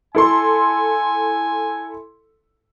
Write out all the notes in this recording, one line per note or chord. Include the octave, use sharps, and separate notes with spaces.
E4 A4 G#5 C6